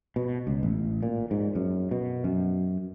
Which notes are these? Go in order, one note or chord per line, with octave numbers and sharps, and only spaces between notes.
B2
C#2
A1
A#2
G#2
F#2
B2
F#2